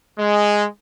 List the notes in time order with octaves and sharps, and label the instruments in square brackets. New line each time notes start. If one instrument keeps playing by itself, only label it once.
[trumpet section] G#3